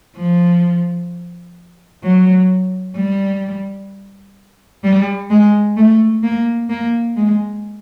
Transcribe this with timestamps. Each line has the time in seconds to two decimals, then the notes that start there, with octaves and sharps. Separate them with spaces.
0.16 F3
2.03 F#3
2.96 G3
4.84 G3
5.30 G#3
5.77 A3
6.23 A#3
6.70 A#3
7.16 G#3